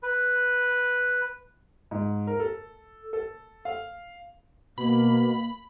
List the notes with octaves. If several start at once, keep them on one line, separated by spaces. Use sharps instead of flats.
B4
G#2
A#4
A4
A4
F5
B2 A#3 B5